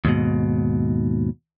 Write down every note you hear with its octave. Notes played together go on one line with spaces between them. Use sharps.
D#2 G#2 B2